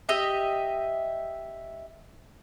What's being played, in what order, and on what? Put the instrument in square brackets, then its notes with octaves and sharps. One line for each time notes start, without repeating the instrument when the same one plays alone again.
[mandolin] G4 D#5 E5